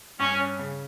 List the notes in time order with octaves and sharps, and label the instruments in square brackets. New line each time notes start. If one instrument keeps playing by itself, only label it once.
[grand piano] G2 [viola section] C#4
[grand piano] C#4
C#3